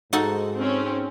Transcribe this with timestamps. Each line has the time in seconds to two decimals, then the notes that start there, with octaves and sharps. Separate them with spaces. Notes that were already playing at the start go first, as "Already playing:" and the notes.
0.13 G#2 D#4 F#4 A4
0.56 C4 C#4